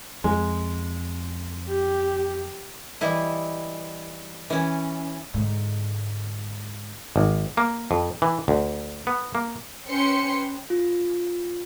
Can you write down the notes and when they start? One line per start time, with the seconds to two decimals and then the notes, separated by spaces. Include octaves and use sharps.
0.24 F2 G#3
1.69 G4
3.01 E3 G3 E4 D#5
4.50 E3 C#4
5.34 G#2 D3
7.16 G#1
7.57 A#3
7.91 F2
8.22 E3
8.48 D2
9.07 B3
9.35 A#3
9.89 C#4 B4 C5 G5 C6 C#7
10.70 F4